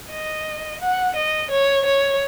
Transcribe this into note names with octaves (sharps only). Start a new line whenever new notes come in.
D#5
F#5
D#5
C#5
C#5